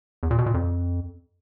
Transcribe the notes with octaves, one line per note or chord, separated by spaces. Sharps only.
E2
A#2
B2
A#2
F2